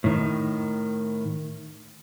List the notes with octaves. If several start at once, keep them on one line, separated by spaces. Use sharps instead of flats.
A2 D#3